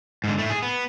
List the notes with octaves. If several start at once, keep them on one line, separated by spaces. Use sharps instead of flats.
G#2 D3
A2 A3
G#4
B3